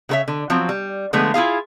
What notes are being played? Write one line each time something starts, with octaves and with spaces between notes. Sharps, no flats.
C#3 F#4 A4 C#5 E5
D3
F3 F#3 C4
G3
D3 F3 G#3 A3 B3
E4 F4 G#4 F5